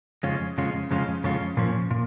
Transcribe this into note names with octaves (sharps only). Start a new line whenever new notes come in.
F2 C#3 G#3 C#4 F4
F2 C#3 G#3 C#4 F4
F2 C#3 G#3 C#4 F4
F2 C#3 G#3 C#4 F4
A#2 F3 C#4
A#2